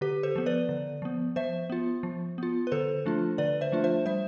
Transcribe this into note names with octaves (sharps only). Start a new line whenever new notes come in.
D3 G4 B4
A4 C5
F3 B3
B4 D5
D3
F3 B3
F3 C5 E5
B3 F4
F3
B3 F4
B4
D3 A4 C5
F3 A3 D4 F4
D3 B4 D5
C5 E5
F3 A3 D4 F4
C5 E5
G3 C5 E5